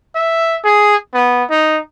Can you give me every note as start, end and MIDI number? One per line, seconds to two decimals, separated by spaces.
0.15 0.57 76
0.64 0.96 68
1.14 1.44 59
1.50 1.78 63